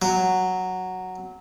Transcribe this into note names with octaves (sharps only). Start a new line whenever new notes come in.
F#3